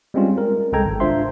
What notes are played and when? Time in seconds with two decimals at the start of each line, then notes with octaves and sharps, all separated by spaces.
0.14 G3 G#3 C4 C#4 F4
0.38 A#4
0.72 C2 G#3 A4 G5 A#5 G#6
0.85 G#1
1.00 D4 F4 C5 E5 C6